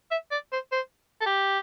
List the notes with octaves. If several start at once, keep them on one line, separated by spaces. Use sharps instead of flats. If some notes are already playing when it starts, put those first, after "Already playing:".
E5
D5
C5
C5
A4
G4